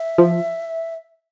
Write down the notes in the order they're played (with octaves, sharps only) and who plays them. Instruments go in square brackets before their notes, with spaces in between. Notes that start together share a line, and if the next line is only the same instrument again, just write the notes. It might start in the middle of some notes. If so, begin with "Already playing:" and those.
Already playing: [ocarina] E5
[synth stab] F3